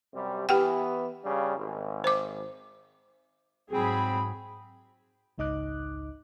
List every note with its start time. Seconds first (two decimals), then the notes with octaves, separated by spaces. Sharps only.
0.14 F#2 C3 G3
0.49 E3 B3 G4 F#5 G5
1.25 G2 C#3 G3
1.58 G#1
2.04 C5 D6
3.71 G#2 F#3 C4 G#4 B5
5.38 G#1 C#2 D#4 D#5 D6 F#6